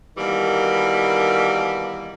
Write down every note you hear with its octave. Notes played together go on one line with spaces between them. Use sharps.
B2 D#3 E3 G3 A#3